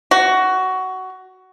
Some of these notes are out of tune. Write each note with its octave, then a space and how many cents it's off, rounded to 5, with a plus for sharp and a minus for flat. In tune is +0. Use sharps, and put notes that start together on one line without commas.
F#4 +15